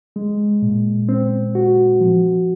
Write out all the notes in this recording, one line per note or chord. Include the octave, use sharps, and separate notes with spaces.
G#3
A#2
C4
F#4
F3